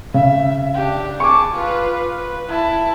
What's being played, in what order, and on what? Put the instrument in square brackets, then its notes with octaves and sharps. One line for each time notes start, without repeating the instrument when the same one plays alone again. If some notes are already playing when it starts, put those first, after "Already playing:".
[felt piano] C#3 [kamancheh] E5
[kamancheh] D4 G4
[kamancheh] G#4 A5 [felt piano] C#6 D6
[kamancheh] F4 B4
B4
E4 A5